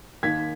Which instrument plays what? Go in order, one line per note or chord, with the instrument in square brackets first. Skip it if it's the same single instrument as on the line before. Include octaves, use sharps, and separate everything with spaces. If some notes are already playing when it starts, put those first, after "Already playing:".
[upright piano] D#2 D#3 G#6 B6